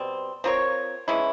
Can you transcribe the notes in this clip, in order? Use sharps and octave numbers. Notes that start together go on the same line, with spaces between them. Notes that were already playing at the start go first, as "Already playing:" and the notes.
Already playing: B2 G3 C4
C4 F4 A#4 C#5
E3 G#3 C#4 E4